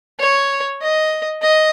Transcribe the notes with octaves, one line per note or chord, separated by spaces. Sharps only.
C#5
D#5
D#5